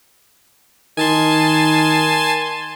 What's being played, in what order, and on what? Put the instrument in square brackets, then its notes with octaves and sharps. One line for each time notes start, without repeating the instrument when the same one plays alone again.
[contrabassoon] D#3 [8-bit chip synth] G#5 A5 C6